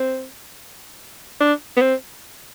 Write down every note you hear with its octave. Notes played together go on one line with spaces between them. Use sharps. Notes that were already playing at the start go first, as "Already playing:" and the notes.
Already playing: C4
D4
B3
C4